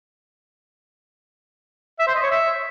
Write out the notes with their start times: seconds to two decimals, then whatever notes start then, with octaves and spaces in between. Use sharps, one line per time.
1.99 E5
2.07 C5
2.15 D#5
2.22 C#5
2.30 E5